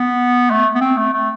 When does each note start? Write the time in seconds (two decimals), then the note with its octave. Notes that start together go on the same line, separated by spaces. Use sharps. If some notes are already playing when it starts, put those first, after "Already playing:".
Already playing: B3
0.51 A3
0.75 B3
0.81 C4
0.97 A3
1.14 A3